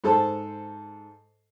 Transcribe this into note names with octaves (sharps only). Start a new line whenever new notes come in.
G#2 A4 C5 A5